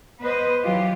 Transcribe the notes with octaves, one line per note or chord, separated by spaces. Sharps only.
B3 B4 C5 D#5
E3 F#3 F4 G4